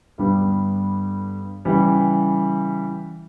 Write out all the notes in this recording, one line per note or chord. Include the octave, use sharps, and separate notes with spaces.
G2 D3 G3 B3
C#3 E3 G3